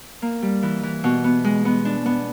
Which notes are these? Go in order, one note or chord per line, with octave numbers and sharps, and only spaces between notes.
A#3
G3
E3
E3
B2
B3
G#3
B3
D4
B3